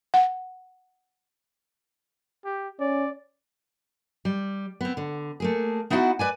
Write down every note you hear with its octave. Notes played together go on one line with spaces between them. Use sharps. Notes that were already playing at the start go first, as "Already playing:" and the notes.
F#5
G4
C#4 D5
G3
B3 C4
D3
A3 A#3 G#4
B3 D#4 E4 F#4 E5 F#5
B4 D5 G#5